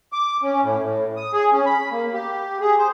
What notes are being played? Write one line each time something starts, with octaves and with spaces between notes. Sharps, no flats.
D6
C#4
A2
A2
D#6
G#4
C#4
B5
A#3
G4
G#4
C5